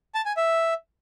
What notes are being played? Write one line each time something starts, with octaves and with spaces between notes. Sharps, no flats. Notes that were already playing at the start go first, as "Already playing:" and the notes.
A5
G#5
E5